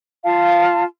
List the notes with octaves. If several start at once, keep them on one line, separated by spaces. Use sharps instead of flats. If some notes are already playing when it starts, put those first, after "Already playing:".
F4 F5 A5